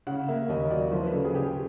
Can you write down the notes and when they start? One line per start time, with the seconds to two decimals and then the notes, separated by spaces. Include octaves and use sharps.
0.07 C#3 F#5
0.28 A#3 E5
0.49 D#2 D#5
0.71 F#3 D5
0.92 F3 C5
1.03 B4
1.13 C#3 A4
1.25 G#4
1.34 C#3 G4
1.45 G#4